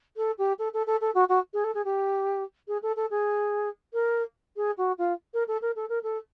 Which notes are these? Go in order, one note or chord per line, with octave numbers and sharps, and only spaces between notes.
A4
G4
A4
A4
A4
A4
F#4
F#4
G#4
A4
G#4
G4
G#4
A4
A4
G#4
A#4
G#4
F#4
F4
A#4
A4
A#4
A4
A#4
A4